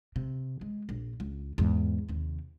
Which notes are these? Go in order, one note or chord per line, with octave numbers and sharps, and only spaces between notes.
C3
G#3
A#1
C#2
E2 G#2
D#2 C3